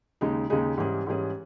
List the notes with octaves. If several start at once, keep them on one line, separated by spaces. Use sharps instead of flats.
D#2 C#3 G#3 D#4 G#4
D#2 C#3 G#3 D#4 G#4
G#2 E3 G3 C#4 G#4
G#2 E3 G3 C#4 G#4